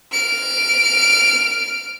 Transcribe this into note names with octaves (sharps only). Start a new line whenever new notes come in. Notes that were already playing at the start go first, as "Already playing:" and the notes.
F6 D7